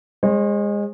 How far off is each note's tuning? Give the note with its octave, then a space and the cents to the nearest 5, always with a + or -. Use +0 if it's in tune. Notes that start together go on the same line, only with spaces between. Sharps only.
G#3 -20 C5 +45